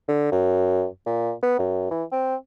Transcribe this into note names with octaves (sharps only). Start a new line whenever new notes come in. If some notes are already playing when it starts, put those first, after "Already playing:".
D3
F#2
A#2
B3
F#2
E3
C4